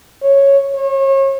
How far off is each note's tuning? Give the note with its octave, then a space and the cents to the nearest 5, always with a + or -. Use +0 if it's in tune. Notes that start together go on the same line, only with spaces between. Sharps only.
C#5 -5
C#5 -35